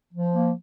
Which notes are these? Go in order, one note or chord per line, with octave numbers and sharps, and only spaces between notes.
F3
A#3